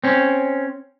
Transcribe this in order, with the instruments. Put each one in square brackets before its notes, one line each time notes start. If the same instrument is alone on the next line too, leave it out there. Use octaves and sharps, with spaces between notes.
[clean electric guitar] C4 C#4